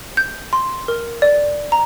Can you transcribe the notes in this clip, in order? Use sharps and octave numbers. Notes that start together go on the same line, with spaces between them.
G6
C6
A#4
D5
A#5